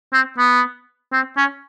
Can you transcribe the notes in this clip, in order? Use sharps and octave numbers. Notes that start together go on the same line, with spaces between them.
C4
B3
C4
C#4